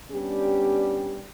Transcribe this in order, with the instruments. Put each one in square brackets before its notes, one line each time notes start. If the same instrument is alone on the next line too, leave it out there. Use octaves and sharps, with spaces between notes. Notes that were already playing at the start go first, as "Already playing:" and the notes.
[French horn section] G3 B3 C#4 D4 G4